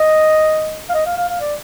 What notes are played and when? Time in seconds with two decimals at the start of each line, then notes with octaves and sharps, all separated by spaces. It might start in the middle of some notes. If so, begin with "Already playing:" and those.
Already playing: D#5
0.89 F5
0.94 D#5
1.06 F5
1.17 F5
1.29 F5
1.41 D5